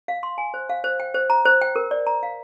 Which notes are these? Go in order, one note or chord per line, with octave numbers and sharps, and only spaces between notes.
F5
C6
G#5
C5
F5
C5
G5
C5
A#5
C5
G5
A#4
D5
A#5
F5